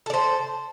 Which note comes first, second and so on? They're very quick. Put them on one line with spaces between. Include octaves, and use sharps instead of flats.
A4 D5 C5